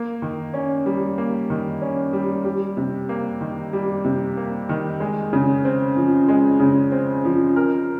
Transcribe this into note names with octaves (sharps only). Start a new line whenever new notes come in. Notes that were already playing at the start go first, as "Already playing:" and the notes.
Already playing: A#3
D#3
C#4
G3
A#3
D#3
C#4
G3
G3
C3
A#3
D#3
G3
C3
A#3
D#3
G#3
C#3
C4
F3
G#3
C#3
C4
F3
A#4